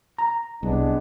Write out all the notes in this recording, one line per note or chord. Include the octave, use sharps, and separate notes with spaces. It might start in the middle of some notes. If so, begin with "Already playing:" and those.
A#5
C2 G#3 B3 D4